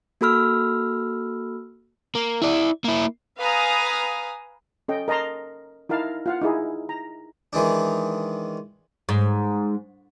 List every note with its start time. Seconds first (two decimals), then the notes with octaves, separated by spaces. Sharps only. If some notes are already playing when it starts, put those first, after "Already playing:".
0.21 A#3 F#4 A4 B5 E6 F6
2.15 A#3
2.42 E4 D5
2.84 A#3 E4
3.38 B4 F5 G#5 A#5 D#6
4.88 C#4 A4 D#5 G5
5.08 A#4 D#5 A5 A#5 C6
5.89 D#4 E4 A#4 F5 A5
6.26 F4 F5 F#5
6.41 D#4 E4 G#4
6.89 A#5
7.53 D#3 E3 G#3 D4
9.09 G#2